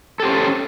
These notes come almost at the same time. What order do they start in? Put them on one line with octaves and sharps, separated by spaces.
A4 G4 C5 C#4